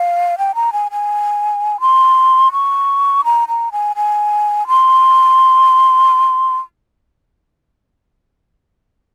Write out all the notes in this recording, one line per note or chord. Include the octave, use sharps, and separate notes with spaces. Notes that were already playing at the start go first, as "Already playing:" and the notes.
Already playing: F5
G5
A#5
G#5
G#5
C6
C#6
A#5
A#5
G#5
G#5
C6